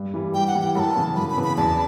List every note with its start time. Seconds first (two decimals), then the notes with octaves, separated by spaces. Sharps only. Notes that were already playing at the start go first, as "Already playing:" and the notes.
Already playing: G2
0.14 E3 G3
0.34 G2 G5
0.48 F#5
0.55 E3 G3
0.61 G5
0.75 F#2 A5 B5
0.96 C#3 E3 B3
1.16 F#2 B5
1.30 B5
1.36 C#3 E3 B3
1.43 B5
1.58 E2 A5